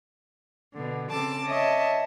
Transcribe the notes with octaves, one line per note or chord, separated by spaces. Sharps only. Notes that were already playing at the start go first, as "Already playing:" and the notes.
B2 D3
C#3 C4 A4 A5 D6
C#5 D#5 E5 A5